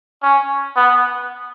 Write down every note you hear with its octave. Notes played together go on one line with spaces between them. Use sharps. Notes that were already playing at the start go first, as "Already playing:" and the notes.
C#4
B3